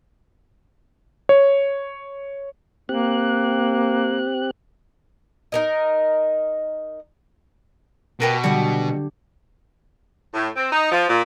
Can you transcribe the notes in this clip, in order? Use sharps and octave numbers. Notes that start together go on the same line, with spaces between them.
C#5
A#3 C4 G4 F#6
D#4 A#4 D#5
B2 G4 A#4 B4
D3 G3 F#4 D#6
A2
C4
D#4
F3
A#2